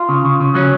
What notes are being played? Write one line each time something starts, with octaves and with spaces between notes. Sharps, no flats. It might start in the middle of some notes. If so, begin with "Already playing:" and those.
Already playing: F4
C#3
C#3
C#3
F#3 C#4